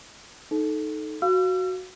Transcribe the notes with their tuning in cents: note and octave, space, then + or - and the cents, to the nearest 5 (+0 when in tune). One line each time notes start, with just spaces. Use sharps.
D#4 +0 A4 -15
F#4 +0 F5 +0 E6 +45